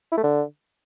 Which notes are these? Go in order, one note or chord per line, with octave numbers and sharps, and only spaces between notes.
E4
A3
D3